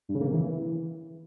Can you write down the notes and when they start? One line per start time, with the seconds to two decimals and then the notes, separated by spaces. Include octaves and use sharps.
0.09 G2
0.15 C#3
0.21 A#3
0.28 C3
0.34 E3